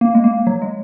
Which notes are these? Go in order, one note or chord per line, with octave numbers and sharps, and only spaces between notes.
A#3
G#3
A#3
F#3
G#3